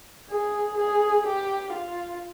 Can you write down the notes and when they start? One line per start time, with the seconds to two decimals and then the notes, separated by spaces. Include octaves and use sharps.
0.30 G#4
0.78 G#4
1.26 G4
1.73 F4